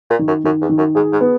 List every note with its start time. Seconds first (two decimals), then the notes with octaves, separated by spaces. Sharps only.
0.10 A#2
0.19 D#3
0.27 F#2
0.44 F#2 D#3
0.61 E2
0.69 D#3
0.78 F#2
0.95 G#2 G#4
1.12 G#2
1.21 B3